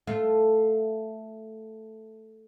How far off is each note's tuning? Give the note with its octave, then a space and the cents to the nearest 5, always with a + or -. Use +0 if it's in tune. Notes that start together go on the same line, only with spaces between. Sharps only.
A3 +0 F4 +0